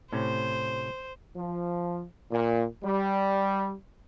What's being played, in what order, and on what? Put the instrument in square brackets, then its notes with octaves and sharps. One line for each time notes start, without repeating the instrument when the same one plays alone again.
[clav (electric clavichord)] A2 C3 C#4 [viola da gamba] C5
[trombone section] F3
A#2
G3